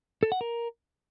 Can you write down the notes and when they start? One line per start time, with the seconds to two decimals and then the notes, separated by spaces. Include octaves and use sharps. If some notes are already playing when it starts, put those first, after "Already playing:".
0.23 A4
0.32 F#5
0.41 A#4